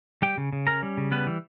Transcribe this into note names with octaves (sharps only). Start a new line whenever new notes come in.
G3 G4 G5
C#3
C#3
C#4 A#4 A#5
G3
C#3
G3 B3 B4
E3